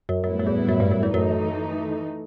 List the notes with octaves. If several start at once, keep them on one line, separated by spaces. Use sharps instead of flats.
F#2
F#2 A2 G3 B3 E4
F#2
E2
F#2
G2
F#2
E2
F#2 E3 A3 D#4